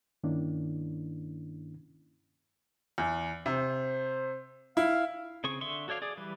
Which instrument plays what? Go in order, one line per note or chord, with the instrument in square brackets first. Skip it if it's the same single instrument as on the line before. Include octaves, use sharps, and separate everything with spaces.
[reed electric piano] G2 D#3 A#3 C#4 D4 E4
[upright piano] E2
[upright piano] C3 [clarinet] C5
[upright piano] E4 [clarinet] F5
[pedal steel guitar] C#3 C4 G#4 C#6
D3 E5 C6 C#6
F#4 A4 C#5 D5 F5
G#4 D5
E3 G3 B4